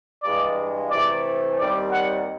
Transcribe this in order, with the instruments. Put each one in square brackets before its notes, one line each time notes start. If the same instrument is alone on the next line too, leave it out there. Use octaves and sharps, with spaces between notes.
[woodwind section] G2 E3 G#3 [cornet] D5
[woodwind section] C3 E3 A3 [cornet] D5
[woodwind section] D#2 D#3 G3 C4 [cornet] D5
[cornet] F#5